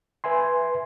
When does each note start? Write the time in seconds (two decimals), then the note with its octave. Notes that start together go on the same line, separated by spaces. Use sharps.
0.24 B4 E5 G#5 C6